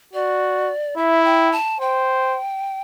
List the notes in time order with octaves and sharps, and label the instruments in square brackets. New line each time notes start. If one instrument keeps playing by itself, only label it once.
[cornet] F#4 [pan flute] D5
[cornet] E4 [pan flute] E5
[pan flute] G5
A5
[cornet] C5 [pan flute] G5